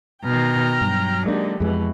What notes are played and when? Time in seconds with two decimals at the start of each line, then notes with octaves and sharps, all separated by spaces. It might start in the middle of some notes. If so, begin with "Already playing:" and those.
0.25 B2 D#3 G5 A#5 F6
0.81 G2 F#3
1.26 D3 G#3 A#3 D4 D#4 G4
1.60 F2 B2 E3 G#3